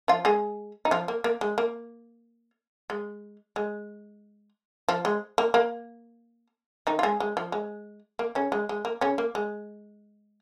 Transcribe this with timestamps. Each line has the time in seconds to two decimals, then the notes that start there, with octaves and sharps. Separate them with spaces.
0.08 F3 F4
0.25 G#3 G#4
0.85 D#4
0.91 F3 F4
1.08 A#3
1.24 A#3
1.41 G#3
1.58 A#3
2.90 G#3
3.56 G#3
4.89 F3
5.05 G#3
5.38 A#3
5.54 A#3
6.87 D#3 D#4
6.99 F4
7.03 G#3 G#4
7.20 G#3
7.37 F3
7.52 G#3
8.19 A#3
8.35 C#3 C#4
8.52 G#3
8.69 G#3
8.85 A#3
9.01 C#3 C#4
9.18 A#3
9.35 G#3